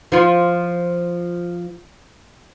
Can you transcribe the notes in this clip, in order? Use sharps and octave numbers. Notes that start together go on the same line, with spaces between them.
F3 F4